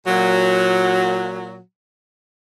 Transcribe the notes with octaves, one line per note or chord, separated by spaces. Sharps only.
A#2 F#3